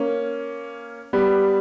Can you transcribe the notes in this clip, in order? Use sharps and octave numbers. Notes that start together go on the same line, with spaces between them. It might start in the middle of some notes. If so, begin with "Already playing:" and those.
Already playing: A#3 C#4
G3 B3